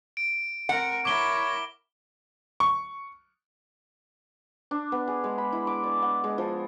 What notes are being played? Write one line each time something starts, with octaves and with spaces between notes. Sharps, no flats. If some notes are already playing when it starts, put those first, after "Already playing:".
D7
C4 A#4 F#5
E4 A#4 C#5 D6 G7
C#6
D4
B3
G#4
G#3
B5
E4
D6
D5
F#5
G#3
F3